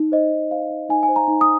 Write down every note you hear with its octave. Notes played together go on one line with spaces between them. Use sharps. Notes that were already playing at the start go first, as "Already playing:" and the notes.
Already playing: D#4
C5 D#5
D#4
C5 F5
D#4
D#4 G#5
G#5
C5
A#5
D#4
D#6